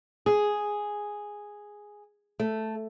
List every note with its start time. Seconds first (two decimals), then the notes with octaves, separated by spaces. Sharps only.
0.26 G#4
2.40 A3